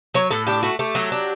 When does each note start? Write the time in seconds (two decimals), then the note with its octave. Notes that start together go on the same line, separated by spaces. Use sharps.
0.14 F#3 C#5
0.30 A2 A4
0.47 D4 G4
0.63 A3 F#4
0.79 A3 G4
0.95 F#3
1.12 D4